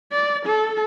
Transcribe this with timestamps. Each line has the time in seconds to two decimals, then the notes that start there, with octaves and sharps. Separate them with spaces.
0.12 D5
0.46 A4